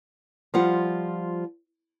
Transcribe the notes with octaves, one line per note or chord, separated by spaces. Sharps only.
F3 G3 F4 F#5